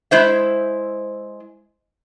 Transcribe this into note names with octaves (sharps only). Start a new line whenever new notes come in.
G#3 E4 C5 E5